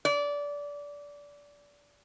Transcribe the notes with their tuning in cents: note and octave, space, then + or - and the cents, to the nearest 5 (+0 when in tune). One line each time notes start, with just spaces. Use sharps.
D5 -20